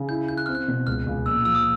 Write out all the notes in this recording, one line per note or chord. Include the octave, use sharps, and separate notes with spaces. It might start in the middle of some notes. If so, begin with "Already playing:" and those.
Already playing: C#3
E4 G6
E4 G6
F#6
C4 F6
F#6
B2
C#2 F6
C#2
A#1 E6
F3 E6
D#6